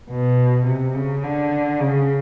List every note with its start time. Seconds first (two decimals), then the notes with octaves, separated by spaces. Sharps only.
0.10 B2
0.66 C3
0.95 C#3
1.24 D3
1.80 C#3